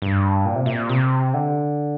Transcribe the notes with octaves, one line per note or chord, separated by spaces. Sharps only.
G2
A#2
C3
A#2
C3
D3